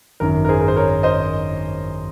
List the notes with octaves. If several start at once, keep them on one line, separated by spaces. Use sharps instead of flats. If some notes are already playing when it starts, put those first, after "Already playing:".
G#1 F#2 D#3 A#4
A#4
G#4 C5
A#4
C5
A#4 C#5
C5 D#5